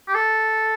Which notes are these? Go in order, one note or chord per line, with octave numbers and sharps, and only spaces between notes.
G4
A4